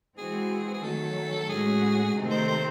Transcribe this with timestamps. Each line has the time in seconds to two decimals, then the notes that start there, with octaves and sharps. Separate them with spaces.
0.17 E3 G#3 C4 F#4 G#4
0.74 G#4
0.83 D#3 F#3 A3 A4
1.48 A2 G#3 C#4 F#4 G#4
2.15 C3 D#3 A3 C4 D#4
2.31 C5
2.48 C5